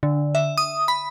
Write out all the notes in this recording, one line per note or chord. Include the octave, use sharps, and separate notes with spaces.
D3
E5
D#6
B5